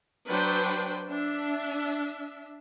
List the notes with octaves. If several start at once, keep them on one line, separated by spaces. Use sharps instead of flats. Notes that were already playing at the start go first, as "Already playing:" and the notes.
F#3 D4 B4 C5 G5
D4 E5